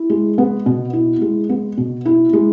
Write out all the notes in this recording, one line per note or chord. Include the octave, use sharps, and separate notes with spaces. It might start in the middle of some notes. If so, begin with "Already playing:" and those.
Already playing: E4
G#3
B3
B2
E4
G#3
B3
B2
E4
G#3